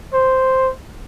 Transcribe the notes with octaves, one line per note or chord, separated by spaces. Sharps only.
C5